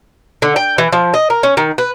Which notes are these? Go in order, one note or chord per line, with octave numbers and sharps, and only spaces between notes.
D3
G5
E3
F3
D#5
A#4
C#4
D#3
B4